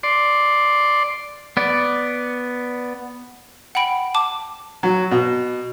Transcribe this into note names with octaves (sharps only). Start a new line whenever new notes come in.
D5 C6
B3 D5
F#5 G5 B5 D7
A5 D6
F#3
B2